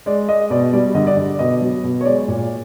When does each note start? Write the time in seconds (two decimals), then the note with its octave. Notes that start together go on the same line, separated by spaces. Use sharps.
0.06 G#3 D5
0.29 G#3 D#5
0.50 B2 D5
0.73 G3 D5
0.95 D3 D#5
1.07 D5
1.17 D3
1.39 B2 D#5
1.61 F#3
1.84 B2
2.01 C#5
2.05 G#3 D5
2.28 A#2